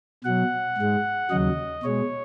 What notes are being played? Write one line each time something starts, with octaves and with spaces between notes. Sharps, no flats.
B2 F#3 F#5
G#2 G#3
D#2 C#3 F#3 D#5
B2 G#3 C#5